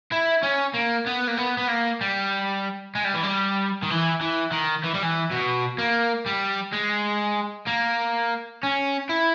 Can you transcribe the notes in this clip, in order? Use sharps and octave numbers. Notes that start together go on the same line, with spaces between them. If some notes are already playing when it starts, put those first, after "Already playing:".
E4
C#4
A#3
B3
A#3
B3
B3
A#3
G3
G#3
G3
E3
G3
D#3
E3
E3
D#3
E3
G3
E3
B2
A#3
G3
G#3
A#3
C#4
E4